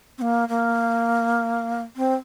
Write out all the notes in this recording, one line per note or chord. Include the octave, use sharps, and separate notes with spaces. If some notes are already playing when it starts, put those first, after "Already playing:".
C4
A#3
A#3
C4